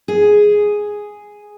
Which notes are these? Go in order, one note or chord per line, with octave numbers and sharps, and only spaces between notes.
G#4